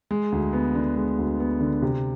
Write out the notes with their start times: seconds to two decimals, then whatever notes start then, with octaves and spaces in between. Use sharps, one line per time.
0.11 G#3
0.32 D2
0.53 B3
0.75 D3
0.96 G#3
1.18 D2
1.40 B3
1.61 D3
1.82 C3